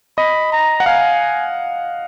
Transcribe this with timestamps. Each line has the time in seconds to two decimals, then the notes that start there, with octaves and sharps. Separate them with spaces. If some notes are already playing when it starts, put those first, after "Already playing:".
0.18 D#5 B5
0.52 A#5
0.80 F#5
0.86 F5 G#5